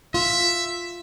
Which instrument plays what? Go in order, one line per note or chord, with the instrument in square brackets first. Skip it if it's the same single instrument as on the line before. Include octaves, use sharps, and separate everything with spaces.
[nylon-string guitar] F4 [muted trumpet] E5